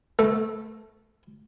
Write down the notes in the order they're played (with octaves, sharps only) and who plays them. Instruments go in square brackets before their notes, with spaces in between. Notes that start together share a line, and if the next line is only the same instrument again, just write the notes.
[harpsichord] A3